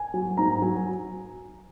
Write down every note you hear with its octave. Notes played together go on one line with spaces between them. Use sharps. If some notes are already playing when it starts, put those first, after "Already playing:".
Already playing: G#5
F#3
G#2 A#5
F#3 G#5